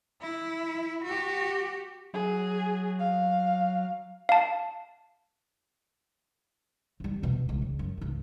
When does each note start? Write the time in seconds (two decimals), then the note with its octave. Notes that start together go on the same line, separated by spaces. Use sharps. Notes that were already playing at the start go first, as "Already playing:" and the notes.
0.21 E4
1.05 F#4 G4
2.14 F#3 G#4
3.00 F5
4.29 F5 A5
7.00 F2 G3
7.23 F2 B2
7.45 C#2 G#2
7.62 C#2
7.79 F#2
7.97 C#2 G#2